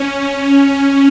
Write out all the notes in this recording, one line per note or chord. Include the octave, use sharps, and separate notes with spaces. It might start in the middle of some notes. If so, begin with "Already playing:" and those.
Already playing: C#4